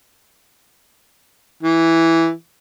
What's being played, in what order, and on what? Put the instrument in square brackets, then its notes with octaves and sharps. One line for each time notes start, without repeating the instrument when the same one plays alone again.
[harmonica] E3